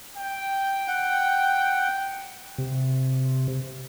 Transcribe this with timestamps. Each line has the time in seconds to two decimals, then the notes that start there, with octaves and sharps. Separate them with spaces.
0.17 G5
0.88 F#5
2.58 C3